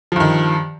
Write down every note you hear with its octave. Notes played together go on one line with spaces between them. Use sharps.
G2 D#3 F3